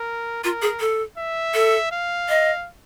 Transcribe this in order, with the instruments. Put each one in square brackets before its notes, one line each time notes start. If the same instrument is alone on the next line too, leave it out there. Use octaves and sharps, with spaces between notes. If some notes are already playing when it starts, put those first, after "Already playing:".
Already playing: [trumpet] A#4
[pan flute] F4 [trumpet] A#4
[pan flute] G#4
A4
[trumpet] E5
[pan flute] A4
[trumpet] F5
[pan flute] D#5